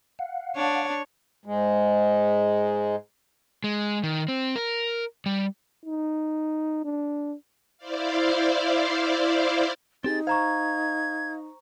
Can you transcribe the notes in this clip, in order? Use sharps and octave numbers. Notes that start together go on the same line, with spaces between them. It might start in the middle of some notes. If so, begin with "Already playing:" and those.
F5 F#5
D4 C#5
G#2 G#3
G#3
D#3
C4
A#4
G3
D#4
D4
E4 C5 D5 F5
C4 D#4 G4 G#4 A6
C5 F5 A#5 C#6 G#6